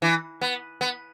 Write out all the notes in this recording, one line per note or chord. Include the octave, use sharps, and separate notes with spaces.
E3
B3
B3